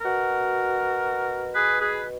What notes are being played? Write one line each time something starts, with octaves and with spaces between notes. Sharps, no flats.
B2 F#4 A#4
G#4 B4
G#4 B4